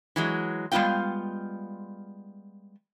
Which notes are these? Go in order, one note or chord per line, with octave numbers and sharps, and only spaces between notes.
E3 F#3 G#3
G3 G#3 B3 F4 F5 G5